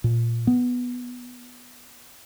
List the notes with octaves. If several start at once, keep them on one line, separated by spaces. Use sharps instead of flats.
A#2
B3